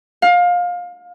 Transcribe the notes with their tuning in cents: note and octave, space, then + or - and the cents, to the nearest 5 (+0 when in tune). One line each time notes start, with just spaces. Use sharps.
F5 +25